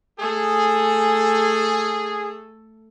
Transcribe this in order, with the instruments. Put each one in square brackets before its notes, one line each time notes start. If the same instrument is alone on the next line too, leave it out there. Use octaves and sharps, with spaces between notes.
[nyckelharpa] A3 A4 [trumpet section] G#4